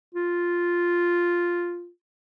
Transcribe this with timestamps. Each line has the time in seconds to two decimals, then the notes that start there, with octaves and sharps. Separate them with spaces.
0.15 F4